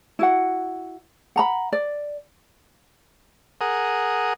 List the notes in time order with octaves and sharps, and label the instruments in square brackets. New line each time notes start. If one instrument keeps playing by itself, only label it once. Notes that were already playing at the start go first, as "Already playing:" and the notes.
[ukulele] E4 F#4 F#5
F#5 A#5 B5
D5
[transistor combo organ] G#4 A#4 F#5 D#6